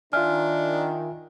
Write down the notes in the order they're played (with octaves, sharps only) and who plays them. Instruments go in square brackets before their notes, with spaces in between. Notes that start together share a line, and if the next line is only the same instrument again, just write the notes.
[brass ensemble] D#3 [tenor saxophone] D4 [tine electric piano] F4 E5 G#5 [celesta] F6